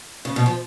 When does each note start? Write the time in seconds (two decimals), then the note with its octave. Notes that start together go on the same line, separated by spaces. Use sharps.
0.25 C#3
0.36 B2
0.46 F3